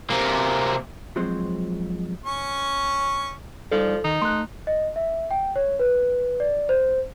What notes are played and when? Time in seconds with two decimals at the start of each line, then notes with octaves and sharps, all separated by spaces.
0.10 C3 A#3
1.16 F3 F#3 G#3 C4 C5
2.25 C#4 C#6
3.72 F3 G3 D#4 A4 D5
4.04 D#3 D#4
4.22 A3 C6 F#6
4.67 D#5
4.96 E5
5.31 G5
5.56 C#5
5.79 B4
6.40 D5
6.69 C5